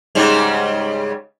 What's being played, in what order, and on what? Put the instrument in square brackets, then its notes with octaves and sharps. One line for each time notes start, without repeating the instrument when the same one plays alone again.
[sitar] G#2 C#3 G3